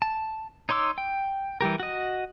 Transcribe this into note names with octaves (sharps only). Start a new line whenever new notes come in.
A5
D#4 C#5 C6 D6 E6
G5
E3 G3 G4 A#4
F#4 D#5